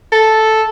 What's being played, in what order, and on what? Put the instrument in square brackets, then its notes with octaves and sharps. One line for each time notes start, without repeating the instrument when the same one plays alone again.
[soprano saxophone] A4